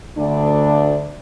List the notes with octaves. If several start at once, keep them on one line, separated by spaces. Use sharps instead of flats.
D2 D4